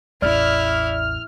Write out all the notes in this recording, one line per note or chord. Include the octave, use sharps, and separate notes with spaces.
A1 E2 E4 D5 F6